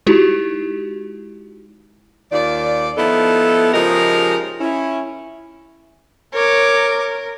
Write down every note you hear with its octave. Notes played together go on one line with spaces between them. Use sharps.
G#3 D#4 E4 F#4 G4
D#2 D#3 F4 D5
F3 B3 D#4 E4 A4
C#3 F3 G#3 D#4 G4 A#4
C#4 E4
A#4 C#5 D6